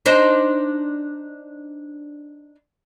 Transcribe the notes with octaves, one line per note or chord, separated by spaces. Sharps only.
D4 D#4 C5